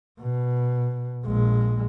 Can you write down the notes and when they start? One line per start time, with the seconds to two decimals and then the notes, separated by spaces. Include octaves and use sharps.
0.20 B2
1.25 A#1 G#3